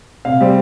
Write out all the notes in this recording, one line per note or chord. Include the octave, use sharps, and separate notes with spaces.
C3 F5
G3 C4